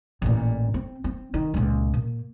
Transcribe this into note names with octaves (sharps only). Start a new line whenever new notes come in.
A1 A#2
C4
C4
D#3
C#2 A#2
A#2